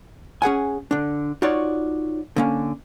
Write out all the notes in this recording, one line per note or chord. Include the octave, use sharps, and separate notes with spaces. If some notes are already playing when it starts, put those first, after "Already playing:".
C#4 G#4 F#5 G#5
D3 D4
D#4 F4 F#4 C#5 D5
D3 A#3 C#4